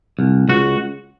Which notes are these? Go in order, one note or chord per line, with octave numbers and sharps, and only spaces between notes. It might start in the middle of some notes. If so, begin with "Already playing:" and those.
C2
C#2 F#4